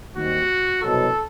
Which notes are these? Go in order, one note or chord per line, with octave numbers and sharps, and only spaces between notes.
D#2 D#3 G3 C4 F#4
C2 B2 F#3 A4